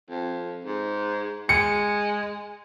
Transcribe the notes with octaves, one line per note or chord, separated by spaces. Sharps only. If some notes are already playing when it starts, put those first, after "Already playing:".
F2
G#2
G#3 C#7